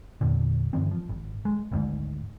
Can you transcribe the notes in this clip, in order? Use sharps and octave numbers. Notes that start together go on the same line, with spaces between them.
E2 A#2 D3
G2 D3 E3 C4
F3
G#1
G#3
G#1 D2 G#2